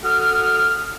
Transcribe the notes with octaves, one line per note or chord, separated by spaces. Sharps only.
F#4 A4 D#6 F6